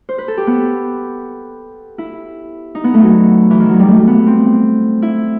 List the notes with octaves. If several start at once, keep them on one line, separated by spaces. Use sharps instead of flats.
C5
B4
A4
G4
B3
E4
D#4
B3
A3
F#3
E3
D#3
F#3
G3
A3
B3
C4
E4